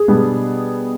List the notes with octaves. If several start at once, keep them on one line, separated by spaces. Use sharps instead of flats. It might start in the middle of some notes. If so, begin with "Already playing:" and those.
Already playing: G#4
B2 G3 B3 D4